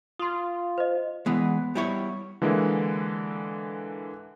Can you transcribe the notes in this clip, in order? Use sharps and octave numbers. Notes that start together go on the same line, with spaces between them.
F4 C6 D#6
C5 D#5
E3 G#3 B3
G3 E4 C#5
D3 E3 G#3 A#3 E4